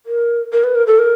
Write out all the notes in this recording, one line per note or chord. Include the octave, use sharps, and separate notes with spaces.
A#4
A#4
B4
A#4
A4
A#4